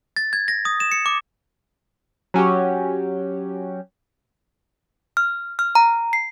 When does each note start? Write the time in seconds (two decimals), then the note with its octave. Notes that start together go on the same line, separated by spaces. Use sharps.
0.16 A6
0.33 G#6
0.48 A#6
0.65 D#6
0.80 E7
0.92 C#7
1.06 D6
2.34 F#3 C#4 F#4 G4
5.17 F6
5.59 F6
5.75 A#5
6.13 C7